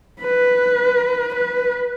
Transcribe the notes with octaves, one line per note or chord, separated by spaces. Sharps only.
B4
B4